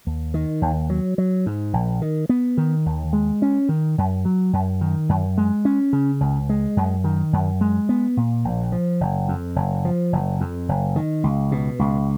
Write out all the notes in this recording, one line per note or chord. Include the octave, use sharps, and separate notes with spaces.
D#2
D#3
D#2
F#3
F#3
G#2
A#1
D#3
B3
D#3
D#2
G#3
C#4
D#3
F#2
F#3
F#2
D#3
F#2
G#3
C#4
C#3
C#2
G#3
F#2
D#3
F#2
G#3
B3
A#2
A#1
F3
F#1
F2
F#1
F3
F#1
F2
F#1
D#3
C#2
B2
C#2